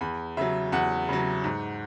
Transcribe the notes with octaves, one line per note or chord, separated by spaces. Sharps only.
E2 B5
C#3 F#3 E5
E2 F#5
C#3 F#3
G#2